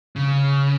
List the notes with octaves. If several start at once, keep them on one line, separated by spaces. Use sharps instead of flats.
C#3